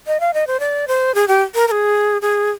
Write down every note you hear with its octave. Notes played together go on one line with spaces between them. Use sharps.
D#5
F5
D#5
C5
D5
C5
G#4
G4
A#4
A#4
G#4
G#4